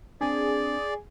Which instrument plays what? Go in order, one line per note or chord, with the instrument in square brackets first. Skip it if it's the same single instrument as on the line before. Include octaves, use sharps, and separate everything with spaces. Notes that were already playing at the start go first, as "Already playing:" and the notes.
[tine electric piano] C4 D4 [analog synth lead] G#4 [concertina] D5